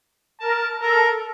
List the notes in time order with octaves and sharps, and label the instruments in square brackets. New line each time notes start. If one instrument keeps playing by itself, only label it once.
[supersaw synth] A#4 [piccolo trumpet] A5
[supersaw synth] A4 [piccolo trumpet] A#4